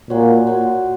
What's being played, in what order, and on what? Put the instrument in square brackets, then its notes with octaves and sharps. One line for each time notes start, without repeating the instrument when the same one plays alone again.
[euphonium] A#2 [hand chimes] F#4 C#5 F#5
[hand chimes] F#4 C#5 F#5